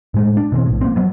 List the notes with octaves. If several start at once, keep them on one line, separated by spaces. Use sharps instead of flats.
A2 G#3 A3
D4
B2 E3 C4
A#1 A2
A#3 C4
F3 F#3 B3